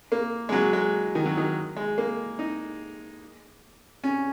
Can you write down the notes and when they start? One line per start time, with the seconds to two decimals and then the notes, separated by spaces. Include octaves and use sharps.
0.12 A#3
0.49 G#3
0.52 F#3
0.73 G#3
1.15 D#3
1.26 F#3
1.37 D#3
1.76 G#3
1.98 A#3
2.39 D#4
4.04 C#4